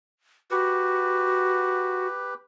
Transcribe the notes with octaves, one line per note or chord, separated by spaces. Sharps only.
F#4 G4 B4